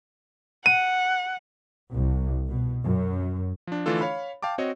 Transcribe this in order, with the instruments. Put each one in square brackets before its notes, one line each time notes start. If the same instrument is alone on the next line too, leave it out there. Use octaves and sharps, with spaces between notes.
[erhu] F#5 [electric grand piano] D#7
[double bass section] C2
B2
F#2
[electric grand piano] F3 D4
D3 E3 A3 D4 F4 A4
C#5 F5 B5
F5 G5 A5 D6
C4 F#4 C#5 D#5